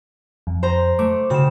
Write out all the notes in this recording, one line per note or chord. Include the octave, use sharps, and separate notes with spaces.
F2
C5 A#5
A3 D6
C#3 F#4 G5 E7